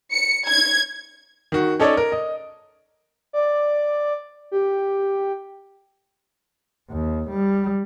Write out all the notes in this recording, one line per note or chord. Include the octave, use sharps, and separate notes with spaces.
C#7
G#6
D#3 F#4
C#4 D#4 A4 C#5 D5
A#4
D#5
D5
G4
D#2
G3